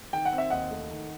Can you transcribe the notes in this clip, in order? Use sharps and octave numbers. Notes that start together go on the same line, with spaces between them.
D#3 G5
F#5
C4
E5
D#2 D#5 F#5
A3
D#3